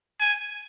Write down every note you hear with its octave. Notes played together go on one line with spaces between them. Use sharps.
G#5